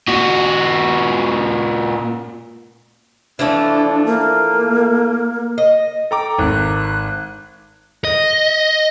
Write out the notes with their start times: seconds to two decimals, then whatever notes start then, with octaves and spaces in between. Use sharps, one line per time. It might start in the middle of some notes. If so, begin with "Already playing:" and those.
0.08 A#2 F#4
3.39 E3 F3 A3 D4
4.06 A#3
5.58 D#5
6.11 A4 G5 A#5 D6
6.38 G#1 F#6
8.04 D#5